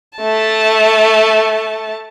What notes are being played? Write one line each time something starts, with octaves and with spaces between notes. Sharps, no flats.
A3 A5